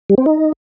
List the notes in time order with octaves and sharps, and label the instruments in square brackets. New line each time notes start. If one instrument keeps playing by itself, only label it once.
[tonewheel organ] G3
C4
D#4